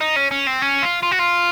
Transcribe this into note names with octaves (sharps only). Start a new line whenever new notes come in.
D#4
C#4
C#4
C4
C#4
F4
F4
F#4
F4